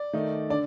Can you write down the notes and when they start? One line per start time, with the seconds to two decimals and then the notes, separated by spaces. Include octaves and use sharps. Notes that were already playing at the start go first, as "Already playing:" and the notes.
Already playing: D5
0.13 D#3 A3 D#4
0.50 D3 D5